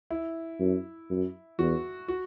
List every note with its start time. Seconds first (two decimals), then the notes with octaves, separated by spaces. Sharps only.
0.11 E4
0.60 F#2
1.10 F#2
1.59 E2 F#4
2.08 F#4